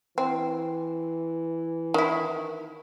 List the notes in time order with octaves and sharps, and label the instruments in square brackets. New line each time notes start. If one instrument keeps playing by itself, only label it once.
[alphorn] E3 [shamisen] C4
[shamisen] D#3 E4